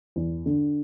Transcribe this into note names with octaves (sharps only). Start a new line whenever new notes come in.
E2
D3